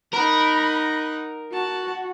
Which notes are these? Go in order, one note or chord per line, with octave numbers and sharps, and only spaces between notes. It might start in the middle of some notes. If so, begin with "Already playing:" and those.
D#4 A#4 F#5 B5
F#4 A5